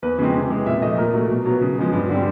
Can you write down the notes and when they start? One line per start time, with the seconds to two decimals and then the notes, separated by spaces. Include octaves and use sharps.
0.02 E2 B4
0.18 C#3 F3 G#3 C4
0.34 C3
0.50 E3 G#3
0.66 A#2 E5
0.82 F3 A3 D#5
0.98 A#2 A#4
1.14 F#3 A3
1.30 B2
1.46 F#3 B3
1.61 C#3
1.78 F3 G#3 B3
1.93 G2
2.09 D3 G3 C4